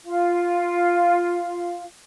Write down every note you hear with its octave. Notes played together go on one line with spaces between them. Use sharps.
F4 F5